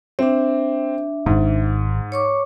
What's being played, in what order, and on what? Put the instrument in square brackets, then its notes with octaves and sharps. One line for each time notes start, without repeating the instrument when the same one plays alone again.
[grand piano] C4 [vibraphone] D4 E5
[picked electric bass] D1 G#1 [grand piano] G#2
[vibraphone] C#5 C#6 D6